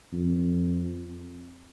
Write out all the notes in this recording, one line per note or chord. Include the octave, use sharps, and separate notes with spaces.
F2